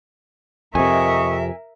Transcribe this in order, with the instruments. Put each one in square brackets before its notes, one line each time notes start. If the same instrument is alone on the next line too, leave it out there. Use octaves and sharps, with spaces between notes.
[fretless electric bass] F2 C3 [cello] A#4 E5 [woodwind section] D#5 C#6 [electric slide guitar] G#5